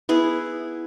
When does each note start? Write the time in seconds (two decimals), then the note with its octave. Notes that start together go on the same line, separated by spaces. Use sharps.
0.09 B3 E4 G#4